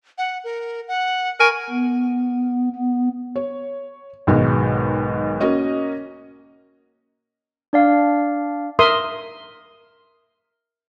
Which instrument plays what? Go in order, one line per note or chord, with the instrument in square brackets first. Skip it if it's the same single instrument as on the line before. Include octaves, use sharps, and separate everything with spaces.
[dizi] F#5
A#4
F#5
[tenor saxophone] A#4 [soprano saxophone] G#5 [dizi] C#6
[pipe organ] B3
B3
[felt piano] C#5
B1 G#2 B2 D#3 G#3
A#3 C#4 F#4 D#5
[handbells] D4 D5 F5
[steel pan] A#4 E5 C6 D#6